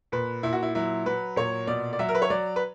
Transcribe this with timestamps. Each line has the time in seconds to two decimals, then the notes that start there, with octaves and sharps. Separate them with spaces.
0.12 A#2 B4
0.43 A#2 E4
0.53 F#4
0.63 E4
0.75 F#3 E4
1.06 F#3 B4
1.36 A#2 C#5
1.67 B2 D5
1.93 D5
1.99 F#3 E5
2.09 A#4
2.15 B4
2.22 C#5
2.30 F#3 D5
2.56 B4